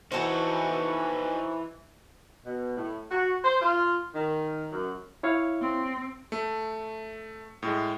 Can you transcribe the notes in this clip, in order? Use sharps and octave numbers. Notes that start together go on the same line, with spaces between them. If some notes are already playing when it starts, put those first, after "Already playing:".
E3 D#4 F#4 A4 C5 C#5
B2
A2
F#4
C5
F4
D#3
F#2
E4 C#5 F5
C4
A3
A2 G#3